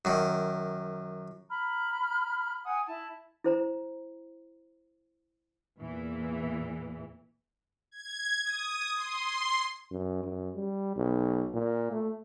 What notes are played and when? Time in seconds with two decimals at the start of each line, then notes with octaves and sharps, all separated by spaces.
0.05 F#2 D#3
1.50 A#5 B5 F6
2.65 F#5 G#5 D#6
2.87 E4 A5
3.44 E4 C5 A#5
5.79 E2 A#2 E3
7.91 G#6
8.45 D#6
8.96 C6
9.91 F#2
10.24 F#2
10.56 G3
10.96 B1
11.54 A#2
11.92 A3